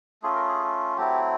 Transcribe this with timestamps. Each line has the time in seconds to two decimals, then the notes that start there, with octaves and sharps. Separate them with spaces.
0.22 A3 C#4 F4 G#4
0.36 A#4
0.48 G#4
0.97 F#3 A3 C4 E4 G4